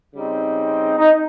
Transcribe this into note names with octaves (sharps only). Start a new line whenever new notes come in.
C#3 G3 C4 D#4
D#4